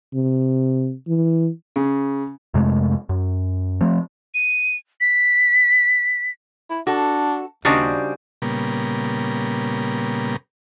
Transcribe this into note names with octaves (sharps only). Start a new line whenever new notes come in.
C3
E3
C#3
F2 C3 G#3 A3
F#2
F3 A3 C4
D#7
B6
E4
D4 F#4 A4
D#2 C#3 G3 D4 D#4 F#4 C5
A#2 C#3 G3 A#3 B3